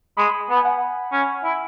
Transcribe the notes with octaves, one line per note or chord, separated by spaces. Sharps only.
G#3 B5
B3
G#5
F#5
C#4 G#5
E4